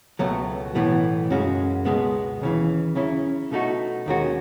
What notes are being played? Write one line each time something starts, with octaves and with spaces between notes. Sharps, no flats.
C#2 B2 F#3 A3
B1 A2 E3 B3
F#2 C#3 G#3 C#4 F#4
C#2 B2 G#3 B3
D#2 C#3 E3
C#3 F#3 C#4 E4
B2 A3 D#4 F#4
D#2 D#3 G#3 C#4 F#4